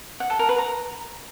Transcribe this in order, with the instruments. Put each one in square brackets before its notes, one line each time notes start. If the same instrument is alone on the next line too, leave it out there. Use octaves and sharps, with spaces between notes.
[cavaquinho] F#5
A4
A#4
B4
A#5